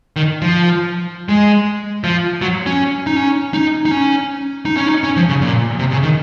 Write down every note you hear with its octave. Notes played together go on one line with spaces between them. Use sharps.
D#3
F3
G#3
F3
F#3
C#4
D#4
C#4
D#4
D#4
C#4
D#4
C#4
D#4
C#4
F3
C#3
A#2
C3
C#3
D#3